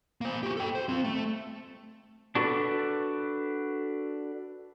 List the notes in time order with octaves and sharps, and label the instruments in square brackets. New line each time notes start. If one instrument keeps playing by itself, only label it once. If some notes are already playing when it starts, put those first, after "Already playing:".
[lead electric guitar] A#3 C5
F#4 G4
A4 G5
C5
C4 F4
A3
[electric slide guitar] D4 F#4 A4 B4